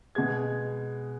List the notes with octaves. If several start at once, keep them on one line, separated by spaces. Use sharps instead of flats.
B2 G#3 G#6